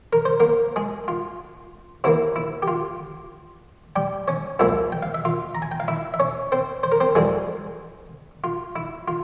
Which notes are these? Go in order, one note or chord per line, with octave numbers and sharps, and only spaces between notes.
A#4
C5
A#3 A#4
G#3 G#4
F4
C3 E3 A#3 E4
E4
G4
F4
G3 G4
C#4 C#5
C2 A#2 F3 G#3 E4 E5
G5
F5
E5
F4 F5
A#5
G#5
G5
F5
E4 E5
E5
C#4 C#5
C4 C5
C5
A#4
C4 C5
F2 E3 G3 G#3 G#4
F4
E4
F4